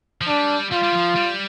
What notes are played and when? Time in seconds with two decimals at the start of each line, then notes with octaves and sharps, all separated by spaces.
0.21 F3
0.27 G3 D4
0.72 G3 F4
0.83 G3
0.93 F3
1.15 G3